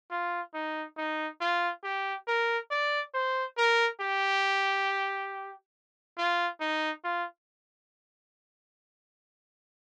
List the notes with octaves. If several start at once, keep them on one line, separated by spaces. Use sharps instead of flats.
F4
D#4
D#4
F4
G4
A#4
D5
C5
A#4
G4
F4
D#4
F4